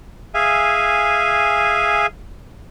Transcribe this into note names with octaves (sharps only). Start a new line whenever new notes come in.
G#4 E5 F5 G#5